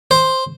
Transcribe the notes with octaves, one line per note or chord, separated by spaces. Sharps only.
C5